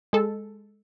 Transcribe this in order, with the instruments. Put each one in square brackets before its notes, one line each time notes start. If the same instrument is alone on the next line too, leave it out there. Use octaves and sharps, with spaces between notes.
[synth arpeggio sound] G#3 A4